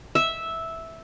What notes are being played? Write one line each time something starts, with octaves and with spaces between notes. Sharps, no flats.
E5